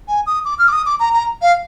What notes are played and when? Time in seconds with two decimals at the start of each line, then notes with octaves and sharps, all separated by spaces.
0.08 G#5
0.27 D#6
0.45 D6
0.59 F6
0.68 D6
0.73 D#6
0.86 D6
1.00 A#5
1.14 A#5
1.42 F5